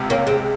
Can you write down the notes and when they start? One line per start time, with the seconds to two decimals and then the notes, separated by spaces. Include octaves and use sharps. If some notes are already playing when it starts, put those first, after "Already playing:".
Already playing: C#2 C3
0.10 A#3 C#4
0.27 G#3 C4